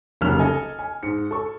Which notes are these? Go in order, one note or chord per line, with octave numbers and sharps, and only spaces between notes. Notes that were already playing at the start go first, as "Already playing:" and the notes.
F1 C#2 F#3 A#3 F6 F7
A4 D#5 G#5
G#5
G#2 C#7
A4 C#6